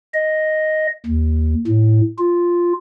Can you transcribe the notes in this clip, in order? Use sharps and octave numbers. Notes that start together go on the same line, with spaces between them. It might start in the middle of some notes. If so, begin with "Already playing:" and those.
D#5
D#2
A2
F4